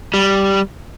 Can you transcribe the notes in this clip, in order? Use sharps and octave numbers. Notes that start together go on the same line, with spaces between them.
G3